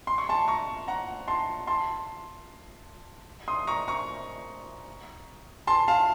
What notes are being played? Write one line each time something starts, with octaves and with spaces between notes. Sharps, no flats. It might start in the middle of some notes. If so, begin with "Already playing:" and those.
C6
C#6
A5 C6
A#5 C#6
F#5 A#5
A5 C6
A5 C6
C6 D#6
A#5 C#6
A#5 C#6
A5 C6
F5 A5